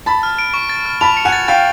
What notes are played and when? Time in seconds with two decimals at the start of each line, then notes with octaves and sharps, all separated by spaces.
0.06 A5 B5 A6
0.23 F6
0.39 D7
0.54 C#6
0.69 A6
0.86 F6
1.01 A5 B5 F7
1.17 C#7
1.25 F#5 G#5
1.33 A6
1.48 F5 G5 A6